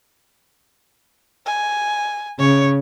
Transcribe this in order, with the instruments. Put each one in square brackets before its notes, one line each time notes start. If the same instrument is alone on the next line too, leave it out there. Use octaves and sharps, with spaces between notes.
[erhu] G#5
[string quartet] C#3 [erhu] C#5